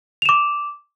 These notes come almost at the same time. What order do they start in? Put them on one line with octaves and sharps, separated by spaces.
F7 E7 D6